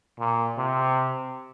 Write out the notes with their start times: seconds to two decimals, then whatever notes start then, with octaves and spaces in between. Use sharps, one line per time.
0.19 A#2
0.58 C3